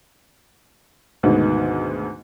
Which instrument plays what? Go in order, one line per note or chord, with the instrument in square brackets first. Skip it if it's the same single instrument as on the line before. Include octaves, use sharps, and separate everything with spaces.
[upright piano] D2 G#2 B2 D#3